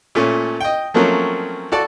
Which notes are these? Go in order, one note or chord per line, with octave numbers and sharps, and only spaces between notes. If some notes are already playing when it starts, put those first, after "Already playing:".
A#2 A3 C#4
D#5 G5
F3 F#3 A3 A#3 C4 C#4
F#4 A4 D5 A5